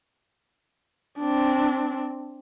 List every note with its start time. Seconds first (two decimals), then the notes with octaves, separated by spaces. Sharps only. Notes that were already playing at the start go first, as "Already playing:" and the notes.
1.19 C4 D4